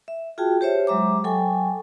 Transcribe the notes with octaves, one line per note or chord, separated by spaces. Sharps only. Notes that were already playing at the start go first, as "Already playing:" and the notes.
E5
F4 F#4 G#4 G5 A5
G4 C5 C#5 E5
F#3 G#3 E5 A#5 D6
F#3 A4 G5 G#5 C#6